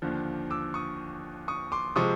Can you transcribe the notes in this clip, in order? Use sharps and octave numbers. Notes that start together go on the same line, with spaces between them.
D#2 D3 F3
D6 E6
C#6 D#6
C#6 D#6
C6 D6
C3 F3 G#3 C#6 D#6